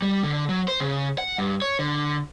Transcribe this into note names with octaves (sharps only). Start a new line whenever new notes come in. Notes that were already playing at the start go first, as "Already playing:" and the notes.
G3
D3
F#3
C5
C#3
F#5
G2
C#5
D3